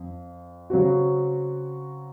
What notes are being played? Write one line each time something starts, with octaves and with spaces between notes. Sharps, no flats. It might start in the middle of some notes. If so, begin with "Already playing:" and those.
Already playing: F2
C#3 F#3 C4 F#4